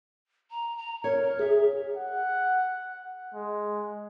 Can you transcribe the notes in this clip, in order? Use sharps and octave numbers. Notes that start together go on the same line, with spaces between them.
A#5
A#5
A#4 C#5
G#4 E5
F#5
G#3